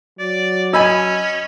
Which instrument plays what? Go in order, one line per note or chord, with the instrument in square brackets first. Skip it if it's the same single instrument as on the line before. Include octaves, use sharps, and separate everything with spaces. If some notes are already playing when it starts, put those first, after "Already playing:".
[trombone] F#3 [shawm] D5
[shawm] C#4 [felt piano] D#5 [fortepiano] G#5 B5 E6